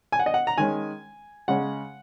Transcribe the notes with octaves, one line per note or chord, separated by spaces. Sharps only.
G#5
F#5
D#5
F#5
A#5
D#3 G#3 C#4 G#5
C#3 G#3 C#4 F#5